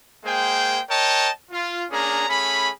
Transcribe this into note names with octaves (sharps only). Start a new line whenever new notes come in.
G#3 A#3 G#4 C5 G5
A#4 C#5 D#5 G5 A5
F4
A#3 C#4 D4 G#4 A#5
A3 C#4 G#4 B5